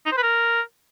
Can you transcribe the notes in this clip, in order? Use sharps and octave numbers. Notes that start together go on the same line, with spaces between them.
D#4
C5
B4
A#4